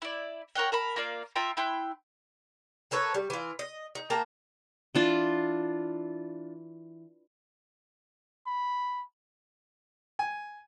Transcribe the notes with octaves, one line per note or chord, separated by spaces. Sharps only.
E4 D5
A#4 C#5 F#5 G5
A#4 A5 B5
A#3 F4 D5 F5
F4 E5 G5 A#5
E4 G5 C6 F#6
A#3 A4 B4 C#5
G3
E3 F4
D#5
D#4
A#3 G5 A5 A#5
E3 D4 F4
B5
G#5